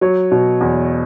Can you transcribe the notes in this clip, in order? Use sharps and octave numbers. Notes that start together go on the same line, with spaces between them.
F#3 C#5
B2
E2